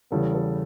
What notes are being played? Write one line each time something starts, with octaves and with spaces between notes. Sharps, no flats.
E2 C#3 E3 G3 B3 A4
A4